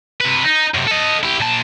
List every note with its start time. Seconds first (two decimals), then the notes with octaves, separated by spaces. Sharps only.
0.21 C3 B4
0.45 D#4
0.74 F#2 C3
0.87 A4 D#5
1.23 E4 G4
1.40 A#2 A5